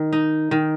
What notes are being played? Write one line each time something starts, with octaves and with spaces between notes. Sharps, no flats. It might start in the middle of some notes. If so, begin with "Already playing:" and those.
Already playing: D#3
D#4
D#3